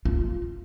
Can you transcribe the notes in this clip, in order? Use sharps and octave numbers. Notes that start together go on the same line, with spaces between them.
F4